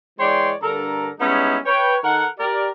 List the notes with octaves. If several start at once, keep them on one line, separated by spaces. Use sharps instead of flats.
E3 G#3 C#5 D5 G5 C6
G2 D3 A4 A#4 A#5
G3 G#3 B3 C#4 D#4 E4
B4 C#5 G5
D#3 A4 A#4 F#5
G4 A#4 D5